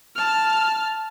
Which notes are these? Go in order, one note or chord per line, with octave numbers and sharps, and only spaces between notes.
A5 F6